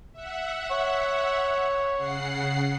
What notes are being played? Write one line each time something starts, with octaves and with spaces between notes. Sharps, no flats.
E5 F#5
C#5
C#3 F#5 C7